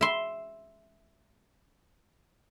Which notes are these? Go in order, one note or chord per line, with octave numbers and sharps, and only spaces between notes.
E5 C6